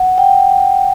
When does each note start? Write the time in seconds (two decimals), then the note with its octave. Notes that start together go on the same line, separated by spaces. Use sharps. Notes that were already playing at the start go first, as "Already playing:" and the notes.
Already playing: F#5
0.18 G5